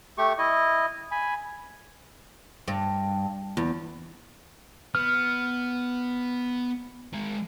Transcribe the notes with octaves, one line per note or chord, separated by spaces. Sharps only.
A3 G4 C#6
E4 D#5
G#5 B5
G2
E2
B3 F6
G#3 A#4